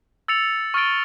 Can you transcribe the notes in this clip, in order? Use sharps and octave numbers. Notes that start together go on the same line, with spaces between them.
E6 A6 C#7 F7
C#6 F6 A6 D7 G7